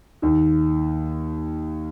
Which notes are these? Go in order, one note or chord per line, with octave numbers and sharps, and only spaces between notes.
D#2 D#3